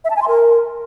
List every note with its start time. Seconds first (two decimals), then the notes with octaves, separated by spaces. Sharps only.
0.04 E5
0.10 A5
0.16 G#5
0.22 C6
0.28 A#4